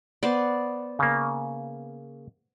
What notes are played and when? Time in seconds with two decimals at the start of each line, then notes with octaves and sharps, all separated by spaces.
0.23 B3 C5 D5
0.99 C#3 A#3